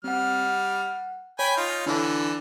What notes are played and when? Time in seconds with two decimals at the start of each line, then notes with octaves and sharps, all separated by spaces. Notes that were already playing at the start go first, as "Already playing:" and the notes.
0.04 G3 C4 F#5 F6
0.44 F#5
1.39 C#5 G5 G#5 B5
1.57 D#4 F4
1.86 D3 E3 D4 E4